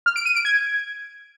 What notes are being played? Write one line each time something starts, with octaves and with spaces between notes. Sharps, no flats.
F6
D7
D#7
D7
G#6